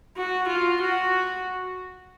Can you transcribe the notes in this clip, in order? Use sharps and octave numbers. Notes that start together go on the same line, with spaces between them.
F#4
F4
F#4